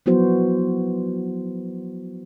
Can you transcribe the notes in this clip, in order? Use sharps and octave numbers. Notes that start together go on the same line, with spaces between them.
F3 F#3 B3 E4 F#4 C5